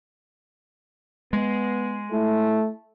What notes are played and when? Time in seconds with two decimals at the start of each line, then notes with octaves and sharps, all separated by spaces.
1.33 G#3 B3
2.12 A3 E4